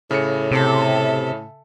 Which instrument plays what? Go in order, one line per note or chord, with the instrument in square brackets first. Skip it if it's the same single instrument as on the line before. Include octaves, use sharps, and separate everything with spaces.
[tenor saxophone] A2 [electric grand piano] C#3 C#7
[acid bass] C3 [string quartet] A4 E5